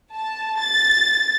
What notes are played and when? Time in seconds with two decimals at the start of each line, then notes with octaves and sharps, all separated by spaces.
0.14 A5
0.60 A6